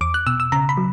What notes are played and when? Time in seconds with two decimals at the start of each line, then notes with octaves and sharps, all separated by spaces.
0.01 E2 D6
0.14 F#6
0.27 B2 E6
0.40 E6
0.52 C#3 A#5
0.69 B5
0.78 F#3